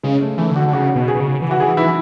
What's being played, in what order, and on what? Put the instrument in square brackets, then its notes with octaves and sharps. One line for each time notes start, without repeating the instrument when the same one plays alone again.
[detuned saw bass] C#3 [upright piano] G#3
[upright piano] A3
[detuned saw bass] E3 [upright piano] A3
[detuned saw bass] C#3
[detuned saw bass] D3 [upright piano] F#4
[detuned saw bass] D3
[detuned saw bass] C#3 [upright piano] F#4
[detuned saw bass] B2
[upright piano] G#4
[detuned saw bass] B2
C#3
E3
[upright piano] F#4
[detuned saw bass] E3 [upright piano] G#4
[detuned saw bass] E3 [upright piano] E4